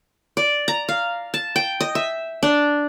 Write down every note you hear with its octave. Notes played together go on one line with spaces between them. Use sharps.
D5
A#5
F5
A5
G5
D#5
E5
D4